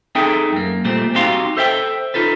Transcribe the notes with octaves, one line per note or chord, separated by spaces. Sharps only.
C4 D#4 G#4 A4 E5 G5
F#2 A#3
A#2 G3 A3 C4
C4 D#4 F#4 G4 F5 C6
A4 C5 E5 F5 G5
D#4 F4 A4 B4